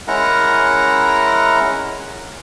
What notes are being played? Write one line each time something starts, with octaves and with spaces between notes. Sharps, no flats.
G#3 C#4 E4 A#4 F#5 A#5